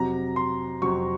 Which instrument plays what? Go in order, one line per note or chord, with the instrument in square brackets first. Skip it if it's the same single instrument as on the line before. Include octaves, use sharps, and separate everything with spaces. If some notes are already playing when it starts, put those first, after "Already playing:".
Already playing: [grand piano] F2 C3 F#3 A#5
C6
F2 C3 F#3 C#6